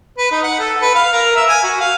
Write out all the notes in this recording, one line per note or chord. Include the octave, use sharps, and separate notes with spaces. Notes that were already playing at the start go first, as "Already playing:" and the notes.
B4
D#4
F#5
A4
B4
F5
A#4
E5
G#5
F#4
F5